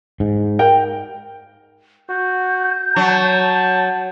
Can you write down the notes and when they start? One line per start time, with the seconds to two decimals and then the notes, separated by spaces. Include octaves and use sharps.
0.20 G#2
0.59 A#4 G5
2.09 F#4 G6
2.96 F#3 A5